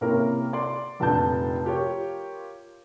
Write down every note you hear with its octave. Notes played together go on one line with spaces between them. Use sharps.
C3 A#3 C#4 E4 A#4
D5 C6
F1 A#1 F2 A5 G6
F4 G4 A#4 C#5